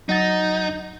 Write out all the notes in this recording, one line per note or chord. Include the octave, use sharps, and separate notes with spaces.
F#3 D#4 F#5 A6